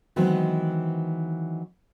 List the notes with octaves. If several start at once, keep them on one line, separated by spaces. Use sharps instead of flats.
D#3 E3 F#3 G#3 B3 C4